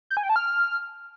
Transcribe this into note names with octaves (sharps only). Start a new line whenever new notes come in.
G6
G#5
G5
A5
F6